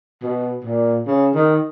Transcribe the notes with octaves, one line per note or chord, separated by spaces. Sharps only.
B2
A#2
C#3
D#3